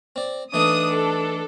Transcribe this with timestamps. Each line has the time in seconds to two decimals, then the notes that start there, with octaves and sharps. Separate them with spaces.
0.16 C4 D5
0.54 E3 A3 D4 D#4 D#6
0.93 A4